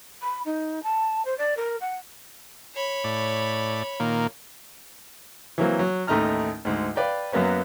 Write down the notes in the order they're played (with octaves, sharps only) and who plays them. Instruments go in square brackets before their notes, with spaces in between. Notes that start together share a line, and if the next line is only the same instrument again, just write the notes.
[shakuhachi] B5
D#4
A5
C5
D5
A#4
F#5
[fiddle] C#5 B5
[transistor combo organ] A2 D5
A#2 D#3 A#3
[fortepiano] E3 F#3 A#3 C4
F#3
A1 D#2 A3 D#4 A#5 F6
D2 G#2
B4 D5 F5 G5
F#2 F#3 A#3 B3 C#4